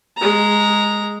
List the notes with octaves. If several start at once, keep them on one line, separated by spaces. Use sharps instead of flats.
G#3 A#5